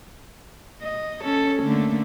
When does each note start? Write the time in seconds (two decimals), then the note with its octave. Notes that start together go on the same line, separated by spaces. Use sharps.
0.83 D#5
1.22 C#4 A4
1.63 D3 A3 A#3